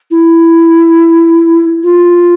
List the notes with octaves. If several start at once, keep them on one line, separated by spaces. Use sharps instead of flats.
E4
F4